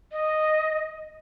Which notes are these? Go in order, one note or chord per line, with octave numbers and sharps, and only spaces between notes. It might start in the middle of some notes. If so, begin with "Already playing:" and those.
D#5